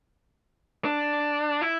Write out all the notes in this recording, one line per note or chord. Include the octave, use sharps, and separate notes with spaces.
D4
E4